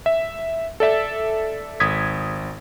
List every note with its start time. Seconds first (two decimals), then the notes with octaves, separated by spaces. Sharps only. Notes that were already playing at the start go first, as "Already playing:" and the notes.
0.06 E5
0.80 A4 D5 E5 A5
1.80 G#1 D#6 G#6 B6